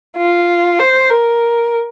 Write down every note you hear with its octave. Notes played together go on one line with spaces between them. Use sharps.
F4
C5
A#4